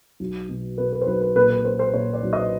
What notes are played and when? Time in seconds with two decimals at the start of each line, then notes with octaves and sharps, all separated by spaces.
0.20 B1
0.49 B2
0.78 B2 B4
0.92 B4
1.01 C5
1.07 B1 B4
1.21 B4
1.36 A#2 B4
1.50 B4
1.65 A#3 C5
1.79 C5
1.94 A#2 C#5
2.13 D5
2.23 B1
2.33 D#5